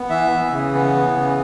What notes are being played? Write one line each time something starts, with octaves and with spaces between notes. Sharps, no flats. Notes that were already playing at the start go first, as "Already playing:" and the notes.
Already playing: B3
E3 E5
E3
C#3
B3
E3
C#3